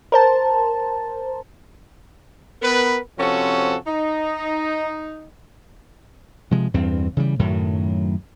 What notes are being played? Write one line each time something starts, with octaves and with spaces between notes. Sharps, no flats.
A#4 C5 A5
B3 A#4 B4
C3 F3 C4 C#4 F#4 A4
D#4
C3 F3 G#3
E2 G2 C4
C#3 E3 G3
F#2 A2 D#3 F#3